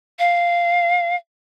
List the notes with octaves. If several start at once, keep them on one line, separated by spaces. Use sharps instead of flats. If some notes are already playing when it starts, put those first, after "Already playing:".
F5